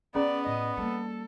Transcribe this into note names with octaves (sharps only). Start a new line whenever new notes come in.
D#3 B3 C#4 G#4 D5 A#5
A2 D#5
G3 A#3 A4